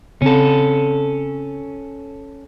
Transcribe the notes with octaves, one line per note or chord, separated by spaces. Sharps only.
C#3 C4 C#4 A4